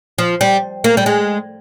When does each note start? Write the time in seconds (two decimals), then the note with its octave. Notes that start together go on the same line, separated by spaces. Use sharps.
0.18 F3
0.41 G3
0.84 A#3
0.97 G3
1.06 G#3